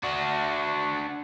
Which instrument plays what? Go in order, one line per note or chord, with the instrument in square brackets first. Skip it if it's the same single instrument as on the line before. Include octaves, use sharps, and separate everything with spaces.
[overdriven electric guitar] D4 F#4